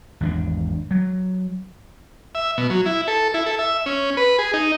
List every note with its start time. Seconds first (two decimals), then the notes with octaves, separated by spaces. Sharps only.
0.21 G#1 E2 C#4 D4
0.91 F#3
2.35 E5
2.58 B2
2.70 F#3
2.86 E4
3.08 A4
3.34 E4
3.46 A4
3.59 E5
3.86 C#4
4.17 B4
4.39 G#4
4.54 D#4